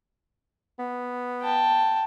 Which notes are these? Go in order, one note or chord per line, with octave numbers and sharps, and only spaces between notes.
B3
G5 A5